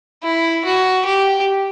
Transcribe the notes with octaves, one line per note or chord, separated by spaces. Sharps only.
E4
F#4
G4